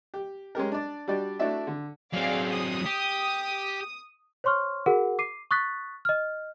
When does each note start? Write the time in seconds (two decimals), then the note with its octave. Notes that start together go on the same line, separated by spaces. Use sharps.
0.14 G4
0.55 G#3 C#4 G4 A#4
0.72 D4 D5
1.08 G3 D4 F#4 G4 D5
1.39 A3 D4 E4 F#4 D5 E5
1.67 D3
2.14 F#3 C4 G#4 D5 F5
2.53 D#6
2.86 G4
4.44 C5 C#5 C6 C#6 F6
4.86 F#4 G#4 A#4 F#5
5.19 D6 C7 D#7
5.51 C#6 D#6 F#6 A6 B6
6.05 D#5 F6